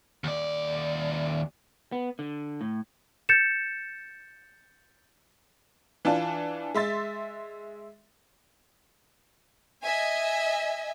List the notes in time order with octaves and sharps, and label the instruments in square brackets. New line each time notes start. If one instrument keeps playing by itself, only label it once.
[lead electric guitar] D#2 D5
[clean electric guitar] B3
D3
A2
[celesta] G6 A6 C#7 E7
[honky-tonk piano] E3 D4 F4 A5
G#3 E5 C6 A6
[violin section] D#5 E5 G#5